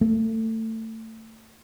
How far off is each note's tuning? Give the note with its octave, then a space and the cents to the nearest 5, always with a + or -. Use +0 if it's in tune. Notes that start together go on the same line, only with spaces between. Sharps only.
A3 +25